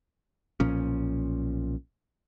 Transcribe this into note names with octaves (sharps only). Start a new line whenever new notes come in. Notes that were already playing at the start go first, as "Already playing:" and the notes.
B1 A#2 F3 C#4